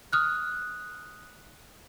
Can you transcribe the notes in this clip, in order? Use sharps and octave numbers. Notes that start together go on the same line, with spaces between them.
D#6 F6 F#6